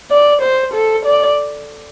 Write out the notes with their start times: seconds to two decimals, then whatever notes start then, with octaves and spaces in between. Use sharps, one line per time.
0.11 D5
0.42 C5
0.74 A4
1.05 D5